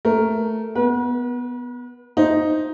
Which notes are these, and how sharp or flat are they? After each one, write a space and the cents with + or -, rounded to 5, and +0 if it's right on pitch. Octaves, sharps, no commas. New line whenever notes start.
A3 +0 A#4 +0
B3 +0 B4 -45
D#4 +0 C5 +0